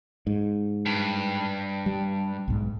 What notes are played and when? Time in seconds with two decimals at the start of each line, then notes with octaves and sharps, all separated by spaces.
0.27 G#2
0.86 G2
1.86 G3
2.48 B1 G#2